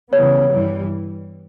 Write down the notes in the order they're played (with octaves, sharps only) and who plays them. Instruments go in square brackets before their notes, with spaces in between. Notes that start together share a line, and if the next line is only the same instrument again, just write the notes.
[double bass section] C#3 E3 G3 B3 [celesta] C#5
[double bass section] G2 E3 G3